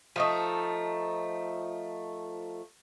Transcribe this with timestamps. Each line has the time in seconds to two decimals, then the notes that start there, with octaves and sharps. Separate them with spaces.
0.16 F3 A3 D#4